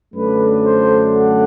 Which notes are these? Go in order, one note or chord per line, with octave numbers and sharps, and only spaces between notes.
F#2 D3 F#3 A3 D4 B4
C5
F#5